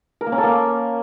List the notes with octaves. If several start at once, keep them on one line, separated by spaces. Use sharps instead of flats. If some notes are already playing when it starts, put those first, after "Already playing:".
A#4
A#3
C#4
A4
A#3